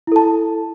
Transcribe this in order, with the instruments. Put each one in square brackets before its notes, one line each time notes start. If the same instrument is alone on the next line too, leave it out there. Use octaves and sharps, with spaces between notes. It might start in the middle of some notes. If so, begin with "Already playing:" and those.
[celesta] E4
A4
A5